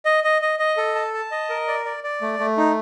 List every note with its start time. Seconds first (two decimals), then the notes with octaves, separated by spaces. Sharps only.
0.05 D#5
0.24 D#5
0.42 D#5
0.59 D#5
0.77 A4
0.95 A5
1.14 A5
1.31 D#5
1.50 A#4
1.68 D5
1.85 D5
2.04 D5
2.21 A3
2.39 A3
2.58 D#4